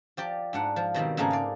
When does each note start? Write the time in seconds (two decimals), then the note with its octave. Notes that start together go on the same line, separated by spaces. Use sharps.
0.17 F3 G4 D5
0.53 G#2 D4 F#5
0.76 F3
0.94 B2 D#3 G3 C4
1.17 G#2 C#3 A3 A#3 G#4 G#5
1.31 D5 F5